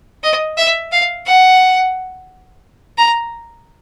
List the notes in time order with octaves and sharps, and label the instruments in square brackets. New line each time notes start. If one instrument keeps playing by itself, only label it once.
[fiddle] D#5
E5
F5
F#5
A#5